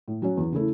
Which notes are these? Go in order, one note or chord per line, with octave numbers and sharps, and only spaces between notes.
A2
F#3 C#4 F#4 C#5
E2
C#3 A3 E4 A4